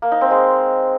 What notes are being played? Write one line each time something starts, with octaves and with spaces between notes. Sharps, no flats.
A#3
D#4
C4
G#3